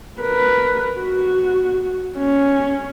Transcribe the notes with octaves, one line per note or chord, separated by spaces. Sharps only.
A#4 B4
F#4
C#4